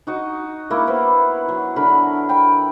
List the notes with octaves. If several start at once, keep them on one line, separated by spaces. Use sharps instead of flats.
D#4 F#4 D#5
A#3 E4 A#4
B3 B4 C5
F#3
D3 A#4 B5
G5 B5